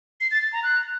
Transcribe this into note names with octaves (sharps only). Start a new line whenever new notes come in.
C7
A6
A6
A#5
F#6